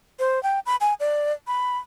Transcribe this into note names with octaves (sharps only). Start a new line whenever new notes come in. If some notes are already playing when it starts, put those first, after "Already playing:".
C5
G5
B5
G#5
D5
B5